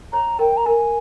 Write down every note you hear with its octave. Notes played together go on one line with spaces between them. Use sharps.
C#5 A#5
A#4 G5
A#5
A#4 G#5